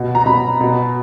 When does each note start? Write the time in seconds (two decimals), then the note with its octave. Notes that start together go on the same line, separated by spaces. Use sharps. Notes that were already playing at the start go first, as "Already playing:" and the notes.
Already playing: B2
0.15 A#5
0.26 B2 B5
0.61 B2